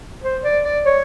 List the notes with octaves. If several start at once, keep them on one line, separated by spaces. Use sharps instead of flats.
C5
D5
D5
C#5